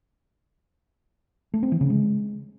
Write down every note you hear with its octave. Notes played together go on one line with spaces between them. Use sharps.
A3
C4
E3
C#3
G#3